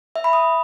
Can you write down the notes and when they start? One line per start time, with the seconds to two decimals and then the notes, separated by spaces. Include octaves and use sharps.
0.16 E5
0.24 B5
0.33 D#6